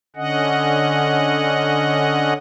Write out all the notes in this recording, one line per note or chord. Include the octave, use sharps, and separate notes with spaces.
D3 C#4 D#5 F#5